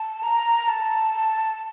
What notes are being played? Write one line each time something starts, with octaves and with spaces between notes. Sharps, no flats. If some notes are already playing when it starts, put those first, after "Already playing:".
Already playing: A5
A#5
A5